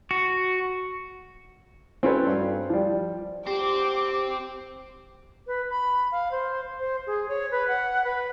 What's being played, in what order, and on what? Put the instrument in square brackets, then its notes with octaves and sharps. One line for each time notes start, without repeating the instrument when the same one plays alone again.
[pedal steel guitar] F#4
[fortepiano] C4 C#4 F#4 A4 B4 C#5
G2
F3 G3
[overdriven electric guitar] C4 [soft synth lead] G4 [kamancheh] D6
[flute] B4
B5
F5
C5
C5
G#4
C#5
B4
F#5
B4